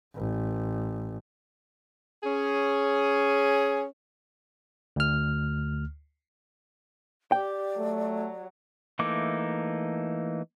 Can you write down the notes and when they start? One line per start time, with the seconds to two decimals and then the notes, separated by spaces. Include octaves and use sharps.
0.15 A1
2.23 C#4 G#4
4.96 D2 F6
7.32 G4 D5 G5
7.77 F#3 A3
8.99 E3 A3 A#3 D#4 D6